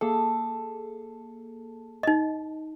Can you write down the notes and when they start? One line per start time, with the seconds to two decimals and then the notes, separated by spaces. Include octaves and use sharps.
0.01 A#3 G#4 A4 A5
2.03 D#4 D#5